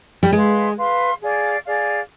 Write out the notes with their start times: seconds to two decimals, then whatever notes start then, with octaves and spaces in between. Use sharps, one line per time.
0.23 G3
0.33 G#3 B4 F5 C6
0.76 B4 F5 C6
1.21 G#4 D5 F5
1.64 G#4 D5 F5